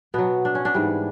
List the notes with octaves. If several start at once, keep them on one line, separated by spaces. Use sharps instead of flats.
B2 F#3 B3
D4
C#4
D4
G#2 E3 G3